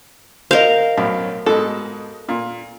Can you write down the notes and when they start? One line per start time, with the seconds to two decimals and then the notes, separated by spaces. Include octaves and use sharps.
0.51 A#4 C5 D#5 F5
0.98 B1 F#2 A2
1.46 G#2 B2 G#3 A4
2.29 A#2